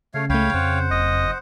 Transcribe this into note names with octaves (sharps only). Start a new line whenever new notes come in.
C#3 A3 C#5 F5
C#2 A3 C#5 F5 G5 B5
F2 C5 F#5
F#1 D#5